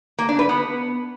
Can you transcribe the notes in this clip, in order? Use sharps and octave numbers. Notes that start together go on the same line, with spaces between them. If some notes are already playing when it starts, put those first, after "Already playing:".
A#3
D4
B4
B3